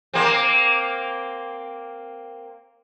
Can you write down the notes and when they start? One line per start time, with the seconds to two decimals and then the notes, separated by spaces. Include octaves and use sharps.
0.14 A#3 C4